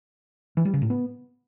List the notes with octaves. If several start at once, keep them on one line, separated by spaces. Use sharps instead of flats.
E3
G3
C#3
A2
B3